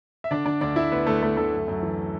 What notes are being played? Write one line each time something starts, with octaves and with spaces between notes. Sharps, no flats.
E5
D3 D4 D5
D3 D4 D5
D2 D4 D5
D2 E4 E5
D2 B3 B4
D2 A3 A4
D2 A3 A4
D2 A3 A4
F#2
F#2
E3